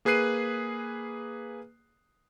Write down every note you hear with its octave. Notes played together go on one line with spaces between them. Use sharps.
A#3 G#4 B4 F#6 C7 D#7